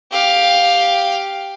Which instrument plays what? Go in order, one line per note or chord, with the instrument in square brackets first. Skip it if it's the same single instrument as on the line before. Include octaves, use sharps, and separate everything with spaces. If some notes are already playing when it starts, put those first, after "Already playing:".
[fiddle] G4 F5